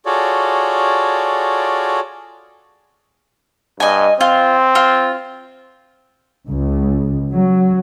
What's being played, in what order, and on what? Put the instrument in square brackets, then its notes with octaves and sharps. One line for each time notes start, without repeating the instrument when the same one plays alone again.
[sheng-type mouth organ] F4 F#4 G#4 A4 C#5 D5
[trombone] G2 [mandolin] D#5 G#5
[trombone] C4 [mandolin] F4
[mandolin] F4
[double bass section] C#2
F#3